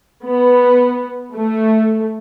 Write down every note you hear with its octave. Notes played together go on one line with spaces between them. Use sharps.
B3
A3